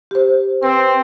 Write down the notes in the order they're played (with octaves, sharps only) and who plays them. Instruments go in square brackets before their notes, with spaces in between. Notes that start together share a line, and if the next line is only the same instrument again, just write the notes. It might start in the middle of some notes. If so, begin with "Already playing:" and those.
[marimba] G4 C5
[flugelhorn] C4 [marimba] B4